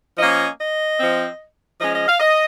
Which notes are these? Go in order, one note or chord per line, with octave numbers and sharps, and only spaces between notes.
F3 A#3 C#4 D#5
D#5
F3 C4
F3 G#3 C#4 D#5
D#5
F5
D#5